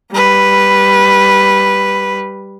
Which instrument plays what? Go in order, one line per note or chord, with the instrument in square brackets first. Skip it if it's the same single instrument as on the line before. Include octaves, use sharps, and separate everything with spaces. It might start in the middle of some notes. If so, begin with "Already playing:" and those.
[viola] G3 B4